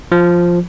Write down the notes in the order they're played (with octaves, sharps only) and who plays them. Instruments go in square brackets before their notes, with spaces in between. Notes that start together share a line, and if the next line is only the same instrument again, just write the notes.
[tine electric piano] F3